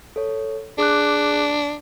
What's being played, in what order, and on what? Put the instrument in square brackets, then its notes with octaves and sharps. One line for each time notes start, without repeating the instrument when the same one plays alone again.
[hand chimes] A4 C#5
[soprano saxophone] D4 [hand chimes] G#4 D6 F#6